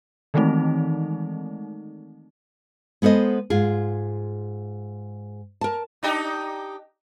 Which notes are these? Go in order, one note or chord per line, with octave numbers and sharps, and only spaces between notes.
D#3 E3 G#3 A3 C4 D#4
G#3 B3 A4 C5 D#5
G#2 F4 G#4
A#4 A5
D4 D#4 G4